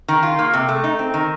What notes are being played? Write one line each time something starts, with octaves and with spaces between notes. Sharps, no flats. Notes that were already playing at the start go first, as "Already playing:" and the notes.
D#3
F4
A#3
C3
A3
D#4
C4
D#3